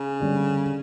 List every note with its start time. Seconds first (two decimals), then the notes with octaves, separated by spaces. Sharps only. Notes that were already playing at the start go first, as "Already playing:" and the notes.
Already playing: C#3
0.20 D3 G3 C#4